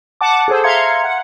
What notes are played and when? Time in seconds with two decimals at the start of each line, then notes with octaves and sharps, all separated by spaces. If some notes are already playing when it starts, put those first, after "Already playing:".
0.21 F#5 A5 D6
0.48 G#4 A4 C5
0.64 E5 F5 A#5 C6 G#6 C#7
1.04 F#5